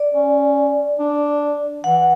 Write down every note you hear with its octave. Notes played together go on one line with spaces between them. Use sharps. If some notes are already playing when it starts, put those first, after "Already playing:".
Already playing: D5
C#4
D4
E3 F#5